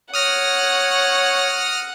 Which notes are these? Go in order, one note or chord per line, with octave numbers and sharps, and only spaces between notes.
C#5 F#5 D#6 F6 A#6